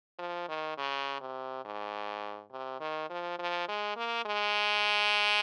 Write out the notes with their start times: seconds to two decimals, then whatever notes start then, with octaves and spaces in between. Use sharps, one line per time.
0.19 F3
0.48 D#3
0.77 C#3
1.21 C3
1.65 G#2
2.51 C3
2.80 D#3
3.10 F3
3.39 F3
3.68 G#3
3.97 A#3
4.25 G#3